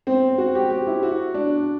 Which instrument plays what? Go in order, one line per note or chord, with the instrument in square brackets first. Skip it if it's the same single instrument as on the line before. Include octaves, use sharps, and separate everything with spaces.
[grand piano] C4
F#4
G4
G4
E4
F#4
D4